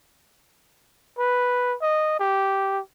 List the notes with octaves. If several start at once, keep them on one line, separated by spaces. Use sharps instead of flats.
B4
D#5
G4